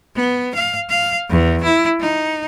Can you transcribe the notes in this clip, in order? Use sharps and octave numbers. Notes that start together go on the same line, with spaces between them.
B3
F5
F5
E2
E4
D#4